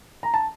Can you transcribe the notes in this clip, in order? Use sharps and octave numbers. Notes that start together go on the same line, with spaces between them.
A#5
A5